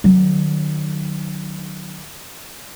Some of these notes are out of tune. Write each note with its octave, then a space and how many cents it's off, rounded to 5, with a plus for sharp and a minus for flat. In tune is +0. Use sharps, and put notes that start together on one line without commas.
D#3 -40 F#3 +0